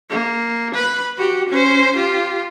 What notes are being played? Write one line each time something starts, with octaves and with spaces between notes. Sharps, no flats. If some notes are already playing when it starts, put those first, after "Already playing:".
A#3
B4 B5
F#4 G4
C#4 C5
F4 G4